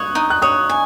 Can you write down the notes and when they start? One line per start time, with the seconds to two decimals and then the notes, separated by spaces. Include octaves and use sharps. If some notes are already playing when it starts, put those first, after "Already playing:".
Already playing: C#5 D#6 F#6
0.15 D#4
0.30 F#6
0.42 C#5 D#6
0.69 G#5